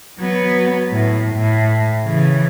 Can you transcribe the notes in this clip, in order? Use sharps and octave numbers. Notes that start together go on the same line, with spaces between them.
F#3 B3
A2
A2
C#3 E3